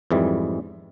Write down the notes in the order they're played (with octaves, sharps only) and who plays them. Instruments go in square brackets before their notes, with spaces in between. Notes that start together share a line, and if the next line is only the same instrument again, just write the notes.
[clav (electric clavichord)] F2 G#2 E3 G3 G#3